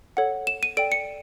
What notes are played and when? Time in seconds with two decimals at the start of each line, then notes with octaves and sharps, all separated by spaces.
0.17 A4 C#5 F#5
0.47 E7
0.63 D#7
0.77 A4 D5 G5 D7
0.92 C#7